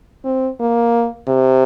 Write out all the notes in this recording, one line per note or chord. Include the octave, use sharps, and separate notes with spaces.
C4
A#3
C3